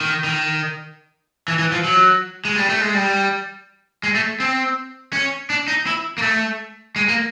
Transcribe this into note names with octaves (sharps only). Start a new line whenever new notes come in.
D#3
D#3
E3
E3
F3
F#3
G#3
G3
A3
G#3
G3
G#3
A3
C4
C#4
D4
D#4
E4
A#3
A3
G#3
A#3